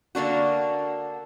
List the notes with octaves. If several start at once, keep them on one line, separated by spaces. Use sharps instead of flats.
D3 A#3 D4 F#4